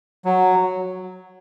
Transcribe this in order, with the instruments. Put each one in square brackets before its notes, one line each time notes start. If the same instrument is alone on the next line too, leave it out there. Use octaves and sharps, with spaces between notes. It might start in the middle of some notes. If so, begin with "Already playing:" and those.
[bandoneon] F#3